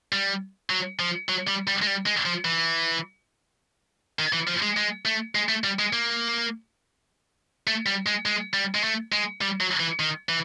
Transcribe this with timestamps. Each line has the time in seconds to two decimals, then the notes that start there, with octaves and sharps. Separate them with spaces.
0.12 G3
0.70 F#3
1.00 F3
1.29 F#3
1.48 G3
1.67 G3
1.82 G#3
1.87 G3
2.06 G#3
2.25 F3
2.45 E3
4.19 D#3
4.33 E3
4.47 F3
4.62 G#3
4.77 G#3
5.05 A3
5.35 G#3
5.49 A3
5.64 G3
5.79 G#3
5.93 A#3
7.67 A3
7.86 G3
8.06 G#3
8.26 G#3
8.54 G3
8.75 G#3
8.84 A3
9.12 G#3
9.41 G3
9.61 F#3
9.80 E3
9.99 D#3
10.29 E3